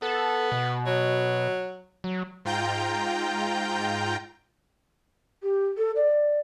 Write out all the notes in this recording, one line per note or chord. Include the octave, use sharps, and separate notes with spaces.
B3 A4
B2
F#3
F#3
G#2 F4 G5 A#5 G6
G4
A4
D5